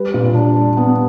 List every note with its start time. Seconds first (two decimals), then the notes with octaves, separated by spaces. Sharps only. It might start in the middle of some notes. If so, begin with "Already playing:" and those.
Already playing: G3 B4
0.14 A#2
0.35 D4
0.57 G3
0.77 B3